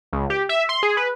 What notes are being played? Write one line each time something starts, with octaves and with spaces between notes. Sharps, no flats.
C#2
G4
E5
C6
G#4
B4